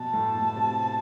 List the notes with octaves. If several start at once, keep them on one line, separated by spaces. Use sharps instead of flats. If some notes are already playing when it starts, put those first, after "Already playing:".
Already playing: B2 A5
A2
B2
C3